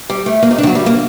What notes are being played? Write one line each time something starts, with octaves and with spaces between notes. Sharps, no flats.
G3
A3
A#3
D#4
D4
D#3
F#3
G3
A#3